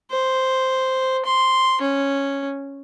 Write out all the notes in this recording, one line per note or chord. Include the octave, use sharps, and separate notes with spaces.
C5
C6
C#4